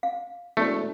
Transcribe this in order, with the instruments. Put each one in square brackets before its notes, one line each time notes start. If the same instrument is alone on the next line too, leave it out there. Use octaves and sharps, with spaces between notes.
[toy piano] F5
[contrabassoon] E1 [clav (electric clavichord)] A3 [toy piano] C5 D5